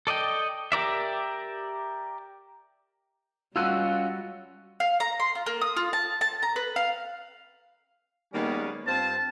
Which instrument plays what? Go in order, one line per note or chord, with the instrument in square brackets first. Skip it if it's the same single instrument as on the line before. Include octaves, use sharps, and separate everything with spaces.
[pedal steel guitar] A4 D5 D#5 G5
G4 A#4 D5 E5
[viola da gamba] G3 [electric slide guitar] C#4 F4 [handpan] F#4 [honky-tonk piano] E6 F#6 D#7
[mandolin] F5
A#5
C6
F4
A#3
D#6
F4
A5
A5
A#5
B4
F5
[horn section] D#3 G3 G#3 A#3 B3 C#4
G2 C4 F4 C5 A5